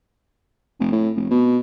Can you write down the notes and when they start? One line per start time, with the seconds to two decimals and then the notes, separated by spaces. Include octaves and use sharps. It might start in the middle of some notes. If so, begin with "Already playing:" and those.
0.80 F1
0.92 A2
1.16 F1
1.31 B2